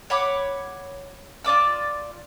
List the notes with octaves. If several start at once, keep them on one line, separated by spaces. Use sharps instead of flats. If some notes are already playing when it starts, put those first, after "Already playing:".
C#5 F#5 B5 D6
F4 D5 D6 E6